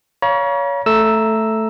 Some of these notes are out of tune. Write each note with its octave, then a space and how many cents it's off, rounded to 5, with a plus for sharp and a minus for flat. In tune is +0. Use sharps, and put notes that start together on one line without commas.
C#5 +25 F5 +0 A#5 +45
A3 +0 A#5 +0 E6 +0